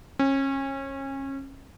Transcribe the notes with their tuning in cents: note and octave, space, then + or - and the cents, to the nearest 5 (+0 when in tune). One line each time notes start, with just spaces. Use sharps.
C#4 -30